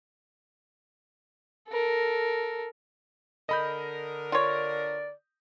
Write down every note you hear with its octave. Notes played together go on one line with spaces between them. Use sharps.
A4 A#4
D3 A#4 D#5 B5 G6
F4 C#5 D5